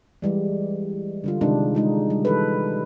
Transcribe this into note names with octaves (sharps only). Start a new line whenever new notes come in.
E3 G3 G#3
D3 G3 F4
C3 D#3 G#3 D4 D#4
G#3 D#4 F4
G3
E3 A4 B4